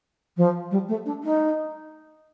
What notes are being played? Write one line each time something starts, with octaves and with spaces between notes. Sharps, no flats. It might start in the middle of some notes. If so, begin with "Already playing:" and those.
F3
G3
A3
D4
D#4